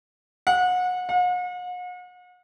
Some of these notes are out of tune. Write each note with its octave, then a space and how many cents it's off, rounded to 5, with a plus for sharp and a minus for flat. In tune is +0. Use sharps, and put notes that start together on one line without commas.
F#5 -30
F#5 -45